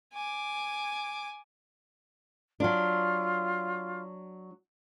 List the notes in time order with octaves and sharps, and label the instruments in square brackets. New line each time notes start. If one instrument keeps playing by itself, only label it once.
[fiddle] G#5 D6
[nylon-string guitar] F#3 D4 [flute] F4